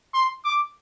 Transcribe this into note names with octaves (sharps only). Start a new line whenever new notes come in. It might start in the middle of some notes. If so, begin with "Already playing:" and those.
C6
D6